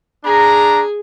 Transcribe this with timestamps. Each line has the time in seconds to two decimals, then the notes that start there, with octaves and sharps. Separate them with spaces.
0.25 D4 G#4 A#5